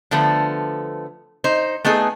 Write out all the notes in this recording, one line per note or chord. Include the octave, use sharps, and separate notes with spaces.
D3 F3 A3 B3
D#4 C5
A3 B3 D#4 G#4